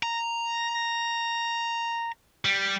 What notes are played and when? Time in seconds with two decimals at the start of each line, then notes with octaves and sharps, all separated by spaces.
0.03 A#5
2.45 G3